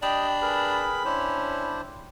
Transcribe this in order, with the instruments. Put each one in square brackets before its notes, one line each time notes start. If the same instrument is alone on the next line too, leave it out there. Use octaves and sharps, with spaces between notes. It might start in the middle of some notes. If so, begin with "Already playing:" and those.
[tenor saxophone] D4 [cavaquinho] G4 [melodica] D#5 G5 [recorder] B5
[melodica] G#4 A#4 B4
[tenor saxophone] C#4 [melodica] D4 E4 C5